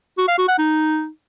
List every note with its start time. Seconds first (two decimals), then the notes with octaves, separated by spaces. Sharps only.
0.18 F#4
0.28 F5
0.38 F#4
0.48 F#5
0.58 D#4